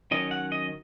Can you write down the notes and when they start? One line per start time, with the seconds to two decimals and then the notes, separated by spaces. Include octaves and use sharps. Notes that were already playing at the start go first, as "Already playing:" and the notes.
0.11 D#3 F#3 C#4 D#5
0.31 F#5
0.52 D#5